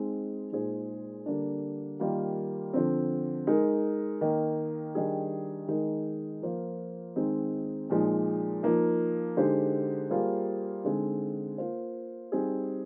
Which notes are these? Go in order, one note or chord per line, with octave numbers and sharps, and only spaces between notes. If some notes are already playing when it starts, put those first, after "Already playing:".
Already playing: G#3 C4 D#4
A#2 G#3 D#4 G#4 C5
D3 G3 A#3 D4
D#3 G3 A#3 F4 A#4
D3 F3 C4
G#3 D#4 A#4
D#3 A#3 D#4
D#3 G3 D4 G#4
D#3 G#3 D#4 A#4
F3 A#3 F4 C5
D#3 G#3 C4 D#4
A#2 F3 G#3 D#4
F3 A#3 D#4
D3 G#3 D#4 G4 C5
G3 A#3 F4 G#4 C5
D3 G#3 C4 D#4
A#3 F4 C5
G3 C4 D#4 G#4